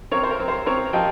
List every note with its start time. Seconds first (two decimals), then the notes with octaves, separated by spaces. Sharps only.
0.11 C4 A#4 C#5
0.23 C5
0.31 A#4
0.40 C4
0.48 C5
0.66 C4 A#4 C#5
0.93 F3 D#5 G5